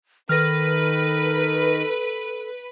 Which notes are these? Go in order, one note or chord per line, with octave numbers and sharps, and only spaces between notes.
D#3 A4 B4 F6 A#6